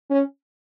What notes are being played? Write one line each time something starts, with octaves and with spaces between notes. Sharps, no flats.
C#4